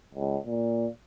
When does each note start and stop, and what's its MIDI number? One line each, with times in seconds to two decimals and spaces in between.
0.14 0.37 37
0.46 0.87 46